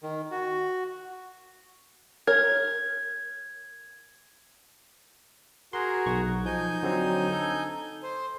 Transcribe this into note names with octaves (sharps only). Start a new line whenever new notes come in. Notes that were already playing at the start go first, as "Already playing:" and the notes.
D#3
F#4
A#4 C#5 G#6
F#4 G#4 A#4 C6
B1 C#6
F3 D#4 G#5 G6
D3 F#3 C4
A4
C5